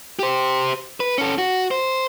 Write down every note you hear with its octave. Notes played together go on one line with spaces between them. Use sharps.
G4 C5
B4
C#4 A4
F#4
C5